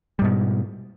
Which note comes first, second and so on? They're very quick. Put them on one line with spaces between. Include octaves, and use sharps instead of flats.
G3 G#2 B2